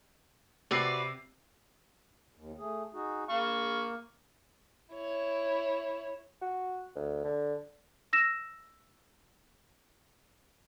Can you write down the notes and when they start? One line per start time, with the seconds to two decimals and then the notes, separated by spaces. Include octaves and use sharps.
0.71 C3 F#4 B4 D5 E6 C7
2.35 D#2
2.59 A3 G#4
2.94 D#4 F#4 G#4
3.30 A#3 F5 C#6
4.94 E4 C#5
6.41 F#4
6.96 D2
7.24 D3
8.13 E6 A#6 E7